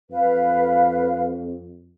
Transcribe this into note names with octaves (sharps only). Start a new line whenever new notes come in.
F2 B4 F5